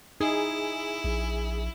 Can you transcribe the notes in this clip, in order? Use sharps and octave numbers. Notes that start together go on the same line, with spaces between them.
D#4 E4 G#4
A#1